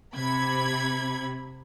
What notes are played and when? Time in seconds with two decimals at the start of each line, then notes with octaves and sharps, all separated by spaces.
0.15 C3 B5 G#6